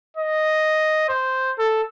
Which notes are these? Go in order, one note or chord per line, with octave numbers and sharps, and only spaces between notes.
D#5
C5
A4